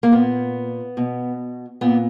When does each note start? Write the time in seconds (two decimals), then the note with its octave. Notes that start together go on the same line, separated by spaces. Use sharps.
0.03 A#3
0.12 A#2 B3
0.97 B2
1.81 A#2 B3